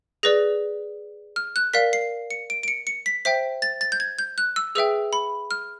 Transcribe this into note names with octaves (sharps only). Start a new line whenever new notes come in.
G#4 B4 D5 A#6
F6
F#6
A#4 D5 F5 B6
C7
C#7
D7
D7
C#7
C#7
B6
C5 E5 G5 B6
A6
A6
G6
G#6
G6
F#6
E6
G#4 B4 E5 G5 E6
B5
F6